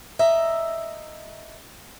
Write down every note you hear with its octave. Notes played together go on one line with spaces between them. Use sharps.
D#5 E5 A#5